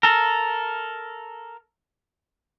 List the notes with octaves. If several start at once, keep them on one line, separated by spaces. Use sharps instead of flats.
A4 A#4